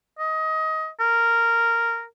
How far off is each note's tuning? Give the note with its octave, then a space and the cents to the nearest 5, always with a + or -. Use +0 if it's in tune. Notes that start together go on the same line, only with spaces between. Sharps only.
D#5 +20
A#4 -10